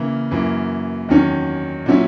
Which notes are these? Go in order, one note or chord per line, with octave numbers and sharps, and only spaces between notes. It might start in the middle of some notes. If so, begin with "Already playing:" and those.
Already playing: C#3 E3 A#3
F#2 E3 A#3
E2 D#3 F#3 C#4
A#2 F#3 C#4 E4